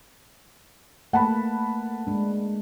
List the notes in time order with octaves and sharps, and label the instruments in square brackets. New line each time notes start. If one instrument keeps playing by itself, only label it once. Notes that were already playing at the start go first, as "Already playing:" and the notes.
[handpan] A3 A#3 B4 [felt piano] F#5 A5 B5
[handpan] G#3 D4